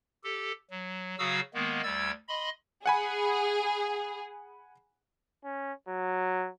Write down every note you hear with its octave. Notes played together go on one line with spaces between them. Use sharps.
G4 A4
F#3
C#3 F#3 F#4 F5 D#6 E6
D#3 G#3 A#3 B3
D2 G3 E6 G#6 A6
D#5 B5 C6
G#4 F#5 G#5 B5
C#4
F#3